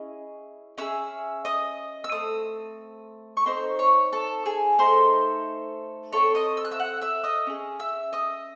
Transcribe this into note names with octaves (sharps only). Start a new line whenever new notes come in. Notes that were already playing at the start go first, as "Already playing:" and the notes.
Already playing: C#4 E4 G#4 D#5
C#4 G#4 E5 E6
D#5 D#6
E6
A3 C4 D#6
C#6
C4 D#4 A4 C5 C6
C#5 C#6
A4 A5
G#4 G#5
A3 D#4 A4 C5 C6
C4 E4 A4 C#5 C#6
D#5 D#6
E6
F#6
E5 E6
F#5 F#6
E5 E6
D#5 D#6
C#4 G#4
E5 E6
D#5 D#6